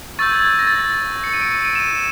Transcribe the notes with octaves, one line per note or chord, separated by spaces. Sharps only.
C#6 E6 G6 A6
G#6
A6
A#6
A6
A#6
C#7
D#7
D7
D#7
E7